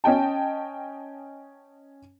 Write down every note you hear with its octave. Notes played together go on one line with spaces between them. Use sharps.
C#4 D#5 G5 A5